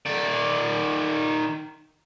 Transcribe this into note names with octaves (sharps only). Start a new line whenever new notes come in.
D#3 D5